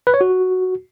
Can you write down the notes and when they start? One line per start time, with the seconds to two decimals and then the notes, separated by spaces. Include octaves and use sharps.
0.07 B4
0.14 C#5
0.21 F#4